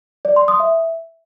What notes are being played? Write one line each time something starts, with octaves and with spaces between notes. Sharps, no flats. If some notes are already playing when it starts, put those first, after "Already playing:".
D5
C6
D#6
E5